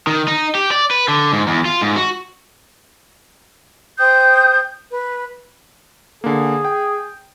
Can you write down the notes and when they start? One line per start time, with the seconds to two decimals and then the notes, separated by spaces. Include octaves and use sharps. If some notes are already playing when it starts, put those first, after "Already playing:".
0.07 D#3
0.28 D#4
0.55 G4
0.72 D5
0.91 B4
1.08 D3
1.33 G#2
1.48 E2
1.65 F4
1.81 G#2
1.96 F#4
3.98 C5 G5 D#6 G6
4.91 B4
6.24 D3 A#3 G#4
6.65 G5